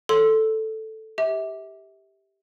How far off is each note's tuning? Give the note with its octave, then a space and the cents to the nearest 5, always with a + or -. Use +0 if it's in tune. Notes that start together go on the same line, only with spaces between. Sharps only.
A4 +0 C#5 +0 C6 +0
G4 +0 E5 -30